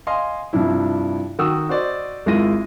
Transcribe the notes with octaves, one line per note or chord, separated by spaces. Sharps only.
D#5 F5 G#5 C6
G2 C3 F3 D4 E4
D#3 F#4 G5 D#6 E6
F#4 C5 D5 D#5
G#1 G#3 E4 F4 A#6 D#7